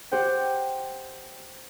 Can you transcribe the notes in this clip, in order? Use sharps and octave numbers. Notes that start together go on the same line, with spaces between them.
G4 C5 F#5 G5